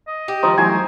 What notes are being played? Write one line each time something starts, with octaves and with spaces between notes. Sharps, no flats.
D#5
G4
D#3 F3 D#4 C5
E3 F#3 A3 C5 G#5